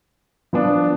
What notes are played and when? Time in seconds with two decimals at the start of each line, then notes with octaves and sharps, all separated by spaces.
0.53 F3 B3 D4